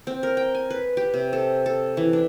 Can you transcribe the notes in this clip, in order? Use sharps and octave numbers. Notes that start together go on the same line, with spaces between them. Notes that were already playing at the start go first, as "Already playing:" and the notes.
C4
A#4
G5
G#5
B4
G4
C3
A4
A4
E3
D4